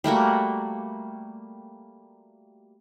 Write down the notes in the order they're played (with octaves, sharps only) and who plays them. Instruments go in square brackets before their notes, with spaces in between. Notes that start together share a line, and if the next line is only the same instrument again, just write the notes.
[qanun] G3 A3 A#3 F#4